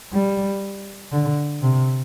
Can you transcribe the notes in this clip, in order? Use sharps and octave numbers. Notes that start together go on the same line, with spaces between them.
G3
D3
C3